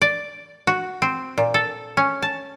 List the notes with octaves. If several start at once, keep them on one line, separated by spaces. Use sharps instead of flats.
D5
F#4
C4
A#2
A4
C#4
A5